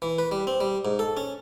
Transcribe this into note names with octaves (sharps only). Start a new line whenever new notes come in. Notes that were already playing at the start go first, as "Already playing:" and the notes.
E3
B4
G3
C4
G3
G#2
A4
C#4